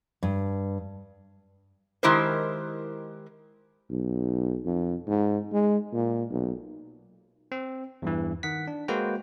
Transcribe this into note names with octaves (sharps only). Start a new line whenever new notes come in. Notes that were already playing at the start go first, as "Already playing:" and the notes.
G2
D#3 G#3 E4 G4 A#4 C5
B1
F2
G#2
G#3
A#2
B1
C4
E2 G2 E3
D#3 F#5 B6
D4
G#3 A#3 F#4 B4 C5 G5